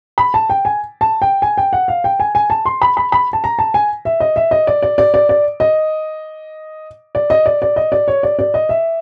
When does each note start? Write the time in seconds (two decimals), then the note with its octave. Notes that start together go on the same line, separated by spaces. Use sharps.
0.18 B5
0.34 A5
0.50 G5
0.65 G#5
1.01 A5
1.22 G5
1.42 G#5
1.58 G5
1.73 F#5
1.88 F5
2.04 G5
2.20 G#5
2.35 G#5
2.50 A5
2.65 C6
2.82 B5
2.97 B5
3.12 B5
3.33 A5
3.44 A#5
3.59 A5
3.74 G#5
4.05 E5
4.20 D#5
4.36 E5
4.51 D#5
4.67 D5
4.83 D5
4.98 D5
5.14 D5
5.29 D5
5.60 D#5
7.15 D5
7.30 D#5
7.46 D5
7.62 D5
7.76 D#5
7.92 D5
8.08 C#5
8.23 D5
8.39 D5
8.54 D#5
8.69 E5